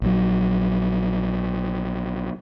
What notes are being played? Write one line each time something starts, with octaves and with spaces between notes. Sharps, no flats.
A#1 F#3